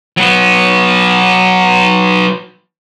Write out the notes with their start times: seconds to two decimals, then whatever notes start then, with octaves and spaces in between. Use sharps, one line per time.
0.17 F#3 B3